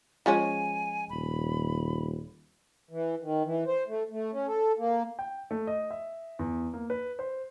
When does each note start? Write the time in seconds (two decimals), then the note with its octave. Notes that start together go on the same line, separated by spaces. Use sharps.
0.26 F3 G#3 C#4 G#5
1.10 D#1 B5
2.91 E3
3.22 D#3
3.45 E3
3.67 C5
3.88 A3
4.11 A3
4.32 C#4
4.47 A4
4.78 A#3
5.19 G5
5.51 A3
5.67 D#5
5.91 E5
6.39 E2
6.74 A#3
6.90 B4
7.19 C5